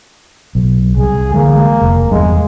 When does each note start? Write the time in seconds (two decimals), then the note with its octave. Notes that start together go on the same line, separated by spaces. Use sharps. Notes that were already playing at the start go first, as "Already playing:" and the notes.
0.55 B1
0.97 C2 G#4
1.34 D3 E3 G#3 A#3
1.81 F1
2.11 E2 G2 G#3